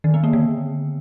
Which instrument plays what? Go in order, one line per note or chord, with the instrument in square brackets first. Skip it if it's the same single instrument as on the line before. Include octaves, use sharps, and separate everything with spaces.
[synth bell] D#3
B3
A#3
D3